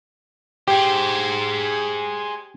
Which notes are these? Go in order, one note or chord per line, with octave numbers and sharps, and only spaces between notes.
G4 G#4 C5